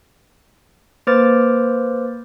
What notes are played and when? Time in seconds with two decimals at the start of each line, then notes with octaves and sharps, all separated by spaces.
1.07 A#3 B4 C5 D6 F6 A6